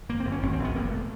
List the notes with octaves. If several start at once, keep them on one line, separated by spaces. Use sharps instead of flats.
G1 A#3
G1 C4
C#4
G#1 C#4
C4
G#1 B3
F1 A#3
A3